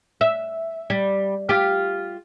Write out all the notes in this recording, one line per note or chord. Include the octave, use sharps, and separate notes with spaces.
E5
G3
F4 G4